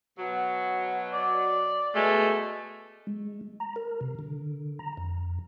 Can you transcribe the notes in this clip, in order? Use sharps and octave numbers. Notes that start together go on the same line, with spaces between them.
B2 F#3
D5
B2 G#3 A3
G#3
A#5
A#4
C3
D3
A#5
F2